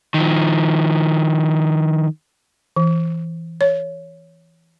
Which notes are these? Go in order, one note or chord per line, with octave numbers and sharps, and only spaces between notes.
D#3 F3
E3
C#5